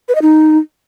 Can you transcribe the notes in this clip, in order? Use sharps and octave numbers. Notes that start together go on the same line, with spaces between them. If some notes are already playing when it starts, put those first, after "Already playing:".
B4
D#5
D#4